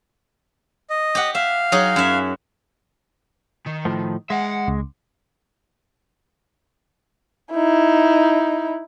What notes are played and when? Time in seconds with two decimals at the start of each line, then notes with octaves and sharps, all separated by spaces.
0.90 D#5
1.15 G4 F#5
1.35 E5 F5
1.72 F#3 D#4 G#4
1.96 F#2 E5
3.66 D#3
3.85 A2 F3
4.30 G#3 E5 F#5
4.67 C#2
7.52 D#4 E4